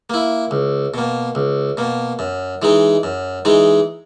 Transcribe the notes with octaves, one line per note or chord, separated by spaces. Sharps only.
A#3 E4
C#2
B2 A#3
C#2
B2 A#3
F#2
E3 G#3 D#4
F#2
E3 G#3 D#4